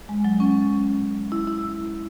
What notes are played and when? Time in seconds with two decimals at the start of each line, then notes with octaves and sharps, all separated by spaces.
0.09 G#3
0.24 F#3
0.40 C#4
1.32 E4
1.47 E4